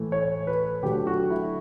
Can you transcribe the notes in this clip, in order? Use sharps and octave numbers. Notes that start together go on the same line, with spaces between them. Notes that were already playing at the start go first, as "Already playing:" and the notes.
Already playing: A2 E3 A3
C#5
B4
D3 F#3 A3 G4
F#4
E4